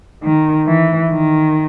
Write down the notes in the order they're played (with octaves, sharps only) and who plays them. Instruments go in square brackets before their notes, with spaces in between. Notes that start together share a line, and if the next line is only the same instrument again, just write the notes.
[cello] D#3
E3
D#3